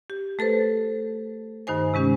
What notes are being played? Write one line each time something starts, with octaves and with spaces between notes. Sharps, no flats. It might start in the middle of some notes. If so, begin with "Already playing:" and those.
G4
A3 A4 B4 C5
G2 D#3 D#4 C5 G#5
C3 G#3 C#4 G4